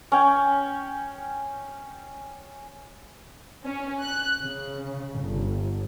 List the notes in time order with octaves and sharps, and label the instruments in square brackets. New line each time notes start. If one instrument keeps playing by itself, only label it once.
[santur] C#4 G5
[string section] C#4
F#6
C#3
G1